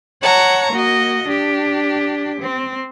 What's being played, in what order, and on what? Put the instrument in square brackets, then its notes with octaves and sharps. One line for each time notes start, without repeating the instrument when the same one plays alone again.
[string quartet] C#5 F#5 A5 A#5 C#6
A#3 F#4 D#5
D4 G4
C4